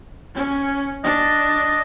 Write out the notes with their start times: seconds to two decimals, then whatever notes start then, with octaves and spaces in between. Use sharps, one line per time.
0.35 C#4
1.04 D4 D#5